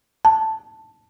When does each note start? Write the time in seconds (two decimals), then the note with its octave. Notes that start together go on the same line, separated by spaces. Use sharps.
0.25 A5